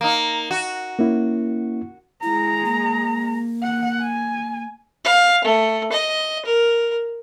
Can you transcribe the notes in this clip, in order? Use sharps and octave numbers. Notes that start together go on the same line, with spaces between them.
A#3 D#4
F#4
A#3 C#4 E4
G#3 E4 A#5
A#3
F#5
G#5
F5
A3
D#5
A#4